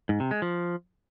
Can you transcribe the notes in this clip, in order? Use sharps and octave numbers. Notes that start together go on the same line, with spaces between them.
G#2
C3
G#3
F3